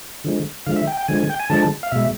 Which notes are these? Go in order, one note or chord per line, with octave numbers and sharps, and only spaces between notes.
D3 F3 G#3
D3 F3 G#3 F5
E5
G5
G5
D3 F3 G#3 G#5
G#5
G5
G#5
D3 F3 G#3 A5
F5
B2 G#3 E5